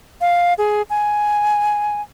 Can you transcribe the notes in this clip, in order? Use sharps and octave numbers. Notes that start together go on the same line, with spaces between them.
F5
G#4
G#5